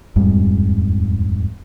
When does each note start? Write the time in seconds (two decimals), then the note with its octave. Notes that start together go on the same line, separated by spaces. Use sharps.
0.16 D#1 F2 G#2 G3